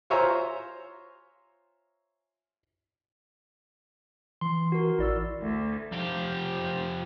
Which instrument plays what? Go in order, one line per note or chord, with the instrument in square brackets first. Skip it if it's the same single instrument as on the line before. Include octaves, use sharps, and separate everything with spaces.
[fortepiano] F4 C5 C#5 E5 G#5 A#5
[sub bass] E3 [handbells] C6
[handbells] F#4 A#4
[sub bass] A1 [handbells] E4 D5 E6
[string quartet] D2
[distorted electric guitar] F3 G4